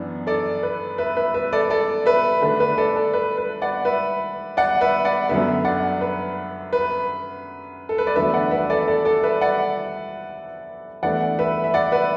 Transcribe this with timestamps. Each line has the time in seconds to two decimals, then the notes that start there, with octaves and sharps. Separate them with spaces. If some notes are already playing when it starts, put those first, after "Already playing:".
Already playing: F#2 E3 B3 D4
0.27 A4 D5
0.63 B4
0.98 B4 E5
1.17 B4 E5
1.34 B4 E5
1.53 A4 D5
1.70 A4 D5
2.06 B4 E5
2.42 D3 A3 D4 B4
2.60 B4
2.78 A4 D5
2.96 A4
3.13 B4
3.38 B4
3.62 D5 F#5
3.85 B4 E5
4.57 D5 F#5
4.81 B4 E5
5.05 D5 F#5
5.29 F#2 D3 B3 B4 E5
5.65 D5 F#5
6.01 B4
6.73 B4
7.89 A4
7.98 B4
8.07 D5
8.15 E2 D3 F#3 A3 D4 B4 E5
8.34 D5 F#5
8.51 B4 E5
8.70 A4 D5
8.87 A4 D5
9.05 A4 D5
9.23 B4 E5
9.41 D5 F#5
11.03 E2 E3 A3 D4 D5 F#5
11.39 B4 E5
11.64 E5
11.74 D5 F#5
11.92 B4 E5